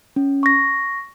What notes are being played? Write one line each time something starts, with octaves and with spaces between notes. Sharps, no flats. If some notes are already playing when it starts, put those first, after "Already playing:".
C#4
C#6 A#6